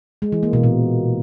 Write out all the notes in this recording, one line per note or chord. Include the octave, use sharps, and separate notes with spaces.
G#3
E3
A#3
B2
A#2